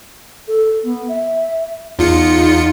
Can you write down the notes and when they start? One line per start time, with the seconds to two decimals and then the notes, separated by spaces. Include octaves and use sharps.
0.48 A4
0.84 B3
1.08 E5
1.99 E2 D#4 F4 C#7